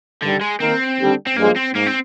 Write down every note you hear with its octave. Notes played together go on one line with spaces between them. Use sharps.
G2 D3 D#3 G3
G#3
D#3 A#3 C4 D#4 A#4
D#2 D3 G3 D4
C4
G2 F3 G#3 A#3
C4
G#2 A#3
C4